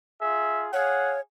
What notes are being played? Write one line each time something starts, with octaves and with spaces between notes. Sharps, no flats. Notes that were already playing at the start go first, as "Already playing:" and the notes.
F4 G#4 E5
G#4 C#5 F5 F#5